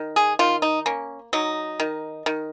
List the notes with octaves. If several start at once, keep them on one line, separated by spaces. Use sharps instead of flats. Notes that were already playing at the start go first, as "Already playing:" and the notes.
Already playing: D#3
G#4
D#3 F4
D#4
A#3 C#4
F#3 D#4
D#3
D#3